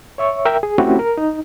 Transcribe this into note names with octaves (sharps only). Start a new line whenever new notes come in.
C#5 E5 C#6
A#4 E5 G5
G#4
A3 C4 C#4 E4 F#4 G4
A#4
D#4